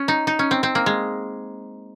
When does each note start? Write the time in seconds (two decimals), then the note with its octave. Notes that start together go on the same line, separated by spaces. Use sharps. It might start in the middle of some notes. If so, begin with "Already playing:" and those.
Already playing: C#4
0.08 D#4
0.27 D#4
0.39 C#4
0.51 C4
0.63 C4
0.75 A#3
0.86 G#3